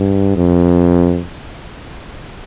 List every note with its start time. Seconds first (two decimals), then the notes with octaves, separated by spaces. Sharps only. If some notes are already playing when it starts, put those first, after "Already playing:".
Already playing: G2
0.36 F2